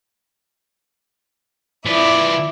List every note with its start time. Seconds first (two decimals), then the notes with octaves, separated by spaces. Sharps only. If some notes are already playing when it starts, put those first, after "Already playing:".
1.86 F3 E4 B4 D5